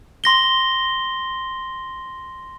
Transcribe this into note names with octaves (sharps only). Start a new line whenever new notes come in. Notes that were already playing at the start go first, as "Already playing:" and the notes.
C6 A#6 G7